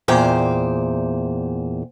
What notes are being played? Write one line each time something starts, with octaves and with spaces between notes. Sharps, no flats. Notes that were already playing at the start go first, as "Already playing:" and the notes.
E2 A#2 C5 G5